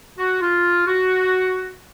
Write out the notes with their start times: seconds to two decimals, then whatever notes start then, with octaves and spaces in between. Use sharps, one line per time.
0.18 F#4
0.41 F4
0.87 F#4